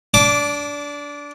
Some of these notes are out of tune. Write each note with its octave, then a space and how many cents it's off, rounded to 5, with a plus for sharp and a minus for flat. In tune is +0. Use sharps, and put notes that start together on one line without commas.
D4 -20 D6 +0